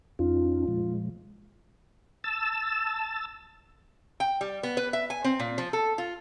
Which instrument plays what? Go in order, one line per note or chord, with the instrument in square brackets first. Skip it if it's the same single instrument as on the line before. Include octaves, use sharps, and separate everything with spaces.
[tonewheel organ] F2 C#4 D#4 [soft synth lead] F4
[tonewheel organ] A#2 F3 G#3
A5 E6
[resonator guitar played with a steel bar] G5
G3
B3
B4
E5
G#5
C4
A#2
F3
A4
F4